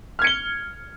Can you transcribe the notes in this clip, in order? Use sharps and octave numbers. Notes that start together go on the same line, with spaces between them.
F6 G#6 C#7 G7